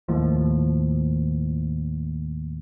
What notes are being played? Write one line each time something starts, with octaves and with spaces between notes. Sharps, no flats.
D#2 A2 F3